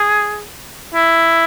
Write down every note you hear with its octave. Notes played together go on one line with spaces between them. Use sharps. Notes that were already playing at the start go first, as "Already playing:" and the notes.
Already playing: G#4
E4